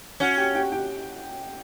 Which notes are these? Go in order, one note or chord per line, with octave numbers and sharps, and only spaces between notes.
C#4 F#4 F#5
G4 G5
G4 G5
G4 G5